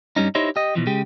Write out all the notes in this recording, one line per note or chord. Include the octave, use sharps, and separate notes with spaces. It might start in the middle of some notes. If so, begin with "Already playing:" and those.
G2 G3 C#4 D#4
D#4 E4 G4 C5 C#5 D#5
G4 D#5
B2 E3 F3
C#3 G#3 G4